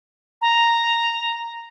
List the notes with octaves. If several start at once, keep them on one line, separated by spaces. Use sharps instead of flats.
A#5